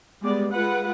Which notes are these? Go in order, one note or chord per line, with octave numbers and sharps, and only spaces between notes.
G3 G#3 B3 D5
G#3 F4 B4 F#5